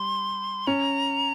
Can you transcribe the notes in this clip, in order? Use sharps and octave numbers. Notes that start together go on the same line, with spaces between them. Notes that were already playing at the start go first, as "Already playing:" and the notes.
Already playing: G3 C6
C#4 A#5